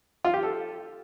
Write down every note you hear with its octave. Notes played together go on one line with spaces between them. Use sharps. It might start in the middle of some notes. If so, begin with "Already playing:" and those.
F4
G4
A4